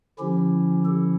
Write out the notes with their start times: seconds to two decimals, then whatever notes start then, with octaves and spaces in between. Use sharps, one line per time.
0.19 D3 F3 C#4 E4 G4
0.85 A4